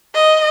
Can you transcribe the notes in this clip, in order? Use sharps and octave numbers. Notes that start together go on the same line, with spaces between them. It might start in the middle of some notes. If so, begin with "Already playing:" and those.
D#5